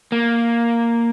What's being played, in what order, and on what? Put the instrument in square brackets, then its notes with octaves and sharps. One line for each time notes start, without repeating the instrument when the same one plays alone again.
[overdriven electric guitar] A#3